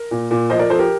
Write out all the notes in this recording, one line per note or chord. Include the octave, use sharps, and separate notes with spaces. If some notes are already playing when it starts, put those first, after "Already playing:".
Already playing: A#4
A#2
A#2
F3 C5 D#5
A#4 D5
F3 A4 C5
G4 A#4